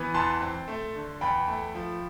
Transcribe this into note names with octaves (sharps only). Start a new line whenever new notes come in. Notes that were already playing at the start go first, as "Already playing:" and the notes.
Already playing: E3 B3
E2 A5 C6
C4
A3
D3
E2 G5 B5
A3
F3